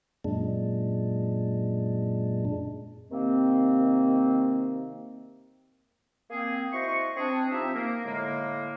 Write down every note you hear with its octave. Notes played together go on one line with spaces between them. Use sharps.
F#2 A#2 G#3 D4
C3 D#3 A#3 C4
A#3 C4 G#4
E4 F#4 C5 D#5 C#6
C4 D4 G#4
F3 C4 D#4 G4 E5 E6
A#3
A2 D3 G#3 A#3